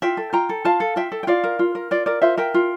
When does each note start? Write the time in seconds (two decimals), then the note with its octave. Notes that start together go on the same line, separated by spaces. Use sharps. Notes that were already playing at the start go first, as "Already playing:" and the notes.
0.02 F4 E5 G5
0.17 A4
0.33 F4 G5 A#5
0.49 A4
0.65 F4 F5 A5
0.80 A4
0.96 F4 E5 G5
1.12 A4
1.23 G5
1.27 F4 D5 F5
1.44 A#4
1.59 F4
1.75 A#4
1.91 F4 D5
2.06 A#4 D5
2.22 F4 C5 E5
2.37 A#4 E5 G5
2.54 F4